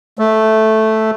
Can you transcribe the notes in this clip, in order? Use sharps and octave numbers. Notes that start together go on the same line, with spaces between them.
A3